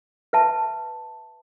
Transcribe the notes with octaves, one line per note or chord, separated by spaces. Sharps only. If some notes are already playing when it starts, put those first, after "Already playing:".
B4 E5 A5